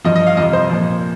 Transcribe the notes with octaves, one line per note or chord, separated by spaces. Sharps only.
G2 F3 D#5
D#5
F5
F2 C3 F3 D#5
C5
A#2 F3